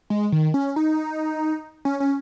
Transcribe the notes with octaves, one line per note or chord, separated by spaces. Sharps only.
G#3
D#3
C#4
D#4
C#4
C#4